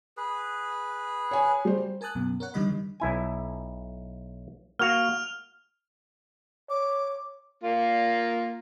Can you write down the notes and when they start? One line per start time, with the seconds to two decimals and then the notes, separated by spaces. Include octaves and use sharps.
0.17 G#4 B4
1.31 C#5 G#5
1.65 G3 C5
2.01 A#4 G#5 A5 D#6 F#6
2.15 F#2 B2
2.40 A#4 C#5 F#5
2.54 F2 D3 D#3 G3 D#5 B5
3.00 B1 E4 G#5
4.79 A#3 F#4 F5 F6 F7
6.70 C#5 D6
7.63 A#3 F4